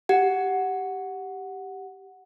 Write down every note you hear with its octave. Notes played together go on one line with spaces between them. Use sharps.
G4 F#5